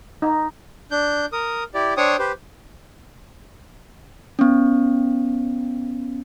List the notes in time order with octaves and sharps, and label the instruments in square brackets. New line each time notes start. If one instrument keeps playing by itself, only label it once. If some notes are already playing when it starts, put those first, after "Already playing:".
[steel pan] D#4
[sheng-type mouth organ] D4 G6
A#4 D#6
E4 G4 D5
D4 C5 C#5 G5 C#6 D#6
G4 B4 C5
[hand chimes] B3 C#4